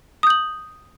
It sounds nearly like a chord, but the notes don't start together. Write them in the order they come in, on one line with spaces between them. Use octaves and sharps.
D#6 G6 F#7